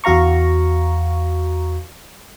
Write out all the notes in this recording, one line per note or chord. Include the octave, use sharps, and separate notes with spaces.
E2 F#4 F5 A#5 C#6